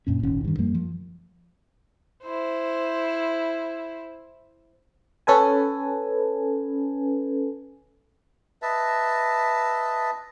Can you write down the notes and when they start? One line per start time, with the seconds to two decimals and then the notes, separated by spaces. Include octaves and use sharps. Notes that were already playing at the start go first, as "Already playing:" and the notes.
0.07 F#2 A#2 C#4
0.23 D#1 G#1 D#3 C#4
0.45 G2 D#3
0.58 F#2 F3 G3 A#3
0.74 F3
2.23 E4 C5
5.27 C#4 A4 B4 G#5
8.62 B4 D#5 E5 A5